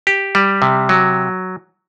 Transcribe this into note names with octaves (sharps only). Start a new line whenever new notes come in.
G4
G3
C3
F#3